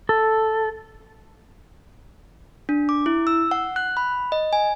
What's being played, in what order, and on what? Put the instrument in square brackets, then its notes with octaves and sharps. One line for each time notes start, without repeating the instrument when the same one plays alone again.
[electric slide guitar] A4
[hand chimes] D4
D6
E4
E6
F#5
F#6
B5
D#5
G#5